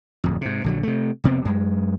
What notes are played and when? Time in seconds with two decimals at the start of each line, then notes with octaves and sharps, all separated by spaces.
0.24 D1 F2
0.41 G#2 C3
0.64 A#1 D3 F#3
0.83 C3 A3
1.24 F1 C3 B3 C4
1.45 F#2 G#3